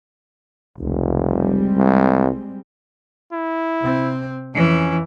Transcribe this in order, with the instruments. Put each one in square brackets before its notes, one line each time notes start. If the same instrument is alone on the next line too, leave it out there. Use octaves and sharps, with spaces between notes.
[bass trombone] F1 [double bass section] C#2
[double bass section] G3 G#3 C4
[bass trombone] C2
[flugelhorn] E4
[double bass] C3 C4
[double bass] F2 [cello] E3 [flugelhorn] C#4